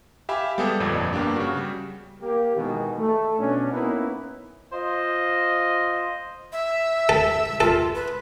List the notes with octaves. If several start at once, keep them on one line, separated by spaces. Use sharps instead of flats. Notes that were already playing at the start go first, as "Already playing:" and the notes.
G4 E5 F5 G#5 B5
G3 G#3 B3 G#4 A4
G1 F2 A#2 D5 D#5
G2 A#3 B3 D4 G4
C#3 F#4
G3
A#3 G4
B2 D#3 E3 G#3 B3
A3
B2 C#4 D4
A#3 B3 C#4 D#4 E4 B4
F4 C5 D#5
E5
A4
F4 A4
B4